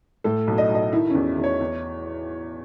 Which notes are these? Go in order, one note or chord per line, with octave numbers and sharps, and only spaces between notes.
A2 A4
B1
D#5
B1 D#5
D#3 E4
E2 C#4
E2
C#5
E2